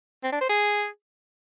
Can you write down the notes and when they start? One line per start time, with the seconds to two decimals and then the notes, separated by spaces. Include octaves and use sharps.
0.24 C4
0.32 D4
0.41 C5
0.49 G#4